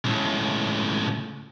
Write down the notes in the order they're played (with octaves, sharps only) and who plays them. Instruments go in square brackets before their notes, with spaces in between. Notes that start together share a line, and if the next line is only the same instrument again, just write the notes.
[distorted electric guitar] C#2 A2